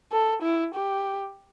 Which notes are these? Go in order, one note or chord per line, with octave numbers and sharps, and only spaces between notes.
A4
E4
G4